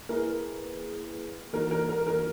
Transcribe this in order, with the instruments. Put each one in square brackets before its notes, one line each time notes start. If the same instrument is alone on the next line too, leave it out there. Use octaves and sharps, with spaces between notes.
[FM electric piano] A#3 E4 G#4 B4 [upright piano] A#4
[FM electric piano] E3 A#3 D#4 F#4 [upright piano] A#4
[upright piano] A#4
A#4
A#4